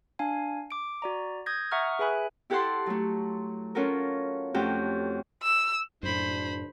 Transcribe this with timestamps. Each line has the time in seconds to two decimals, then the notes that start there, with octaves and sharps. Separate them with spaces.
0.19 D4 F5 G#5
0.71 D6 D7
1.02 F#4 D5 A#5
1.46 D#6 G6 G#6 A#6
1.71 E5 F#5 A#5 C#6 D#6 F6
1.99 G#4 B4 E5 G#5 B5 F#6
2.50 E4 G4 A4 F#5 A5 C6
2.86 F#3 A3
3.75 C#4 F4 F#4 A4 A#4
4.54 F2 A3 C#4 F#4 G4 G6
5.43 E6
6.03 F#1 F#2 A2 D4 C5 B5